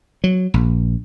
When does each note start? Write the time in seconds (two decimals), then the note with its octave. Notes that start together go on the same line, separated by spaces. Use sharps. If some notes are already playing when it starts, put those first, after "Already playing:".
0.24 F#3
0.54 A#1